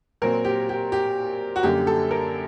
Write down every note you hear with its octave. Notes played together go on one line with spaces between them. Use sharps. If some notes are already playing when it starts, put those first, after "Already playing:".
A#2 F#3 C4 A#4
G4
G4
G4
F#4
F#2 D3 G3 A#3 G4
A4
A#4